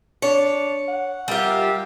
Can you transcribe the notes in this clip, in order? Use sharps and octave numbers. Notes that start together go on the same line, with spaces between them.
D4 C#5
F#5
G3 F4 G4 A#4 E5